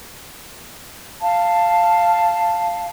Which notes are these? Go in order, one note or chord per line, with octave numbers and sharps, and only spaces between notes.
F5 A5